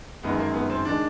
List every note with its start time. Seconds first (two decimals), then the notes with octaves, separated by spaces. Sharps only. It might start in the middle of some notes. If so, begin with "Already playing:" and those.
0.23 G1 F#2 D#3 G#3 B3
0.39 A#3
0.54 B3
0.70 C4
0.85 D#3 G#3 D4